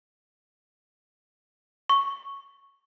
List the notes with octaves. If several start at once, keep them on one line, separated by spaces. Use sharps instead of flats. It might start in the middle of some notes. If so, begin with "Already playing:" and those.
C#6